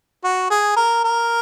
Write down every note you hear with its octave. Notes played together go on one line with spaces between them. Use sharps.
F#4
G#4
A#4
A#4